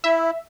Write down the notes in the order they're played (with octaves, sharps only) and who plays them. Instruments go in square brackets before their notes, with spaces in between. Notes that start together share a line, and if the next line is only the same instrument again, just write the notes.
[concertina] E4 [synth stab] E5